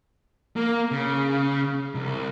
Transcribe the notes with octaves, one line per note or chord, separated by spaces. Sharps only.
A#3
C#3
C2